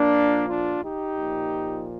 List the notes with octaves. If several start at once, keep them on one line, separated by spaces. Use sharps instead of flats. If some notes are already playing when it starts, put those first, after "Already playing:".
Already playing: A#2 F3 A#3 D4
D4 F4
D#4 G4
A#2 F3